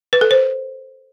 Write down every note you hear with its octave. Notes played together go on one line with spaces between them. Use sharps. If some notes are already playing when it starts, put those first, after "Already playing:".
B4
A4
C5